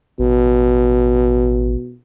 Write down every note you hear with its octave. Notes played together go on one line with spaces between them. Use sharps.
A1 B2